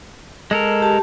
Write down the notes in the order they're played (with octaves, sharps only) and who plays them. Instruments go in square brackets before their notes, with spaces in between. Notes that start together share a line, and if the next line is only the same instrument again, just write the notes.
[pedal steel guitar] G#3 A4 A#4
[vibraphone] G4 A5